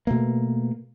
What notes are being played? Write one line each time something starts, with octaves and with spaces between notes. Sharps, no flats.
B2 A3 A#3